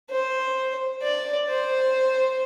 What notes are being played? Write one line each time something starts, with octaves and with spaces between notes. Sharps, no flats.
C5
D5
C5